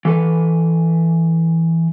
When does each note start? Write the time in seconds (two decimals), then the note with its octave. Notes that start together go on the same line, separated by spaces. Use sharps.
0.05 E3 A4 B4